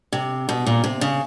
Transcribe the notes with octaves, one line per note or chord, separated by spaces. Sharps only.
C3
B2
A#2
C3
C#3